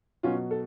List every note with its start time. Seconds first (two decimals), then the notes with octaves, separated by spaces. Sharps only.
0.23 B2 F#3 C#4 F4
0.51 A4